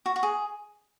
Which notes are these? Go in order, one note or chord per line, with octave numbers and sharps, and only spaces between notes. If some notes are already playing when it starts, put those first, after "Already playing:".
F#4
F#4
G#4